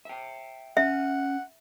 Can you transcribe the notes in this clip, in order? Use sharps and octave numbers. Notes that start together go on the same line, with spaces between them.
E5 G5
C#4 E5 F#5